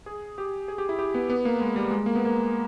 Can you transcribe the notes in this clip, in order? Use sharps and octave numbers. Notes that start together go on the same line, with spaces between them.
G#4
G4
G#4
G4
E4
G4
B3
B3
A#3
G#3
G3
G#3
A#3
B3
A#3